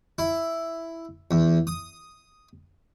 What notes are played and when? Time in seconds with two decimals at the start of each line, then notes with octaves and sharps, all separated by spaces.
0.18 E4
1.31 E2
1.67 D#6